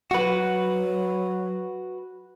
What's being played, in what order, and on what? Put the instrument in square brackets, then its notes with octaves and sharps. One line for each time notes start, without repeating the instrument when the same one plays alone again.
[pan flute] F#3 [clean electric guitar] F#4 B4